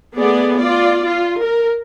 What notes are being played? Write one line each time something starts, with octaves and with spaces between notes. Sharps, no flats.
A3 B3 G#4 D5
F4 D5
F4
A#4